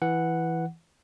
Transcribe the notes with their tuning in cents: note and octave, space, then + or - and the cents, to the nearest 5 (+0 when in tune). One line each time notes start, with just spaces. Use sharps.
E3 +0 F#5 +0